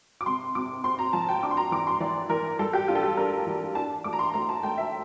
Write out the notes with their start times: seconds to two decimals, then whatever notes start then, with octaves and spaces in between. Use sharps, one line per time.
0.21 D6
0.26 C3 C6
0.55 C3 D6
0.84 C4 C6
0.99 A#5
1.13 F3 A5
1.29 G5
1.42 D4 D6
1.51 C6
1.57 A#5
1.72 E3 D6
1.87 C6
2.00 E3 D5
2.29 E3 A#4
2.59 G3 A4
2.73 G4
2.88 D4 F4
2.95 A4
3.03 G4
3.17 D4 A#4
3.47 E3
3.75 D4 A5
4.04 A3 D6
4.13 A#5
4.19 C6
4.34 A3 A#5
4.49 A5
4.63 A3 G5
4.78 E5